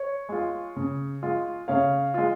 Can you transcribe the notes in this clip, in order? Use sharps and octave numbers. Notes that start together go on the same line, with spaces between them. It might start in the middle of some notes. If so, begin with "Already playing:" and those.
Already playing: C#5
G#3 F4
C#3
G#3 F4
C#3 C#5 F5
G#3 F4